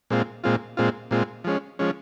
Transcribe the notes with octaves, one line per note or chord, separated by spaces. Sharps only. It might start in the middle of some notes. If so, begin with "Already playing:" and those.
A#2 G#3 C4 F4
A#2 G#3 C4 F4
A#2 G#3 C4 F4
A#2 G#3 C4 F4
F3 G#3 C#4
F3 G#3 C#4